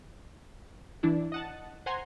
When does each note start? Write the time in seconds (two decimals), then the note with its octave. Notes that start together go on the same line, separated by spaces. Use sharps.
1.03 E3 D4 E4
1.32 D#5 F#5 A5
1.86 C5 F#5 G#5 A#5 C6